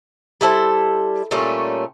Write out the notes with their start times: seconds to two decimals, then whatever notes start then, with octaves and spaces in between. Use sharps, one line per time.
0.41 G3 E4 A4 C5
1.31 A#2 G3 A3 C#4